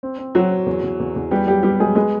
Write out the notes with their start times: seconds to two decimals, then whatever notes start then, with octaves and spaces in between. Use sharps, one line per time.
0.03 C4
0.18 C4
0.35 F#3 C4 F#4
0.50 C4
0.66 E2
0.83 E2
1.00 E2
1.16 E2
1.31 G3 B3 G4
1.47 F#3 G3 G4
1.63 G3 B3 G4
1.79 F#3 G#3 G#4
1.95 G#3 B3 G#4